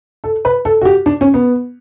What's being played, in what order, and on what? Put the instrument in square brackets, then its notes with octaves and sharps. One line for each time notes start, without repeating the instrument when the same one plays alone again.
[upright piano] A4
B4
A4
F#4
G4
D4
C#4
B3